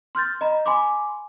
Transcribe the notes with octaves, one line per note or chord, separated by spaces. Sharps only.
C6 F6 G6 A6
D#5 A#5 B5
G#5 B5 C6 D6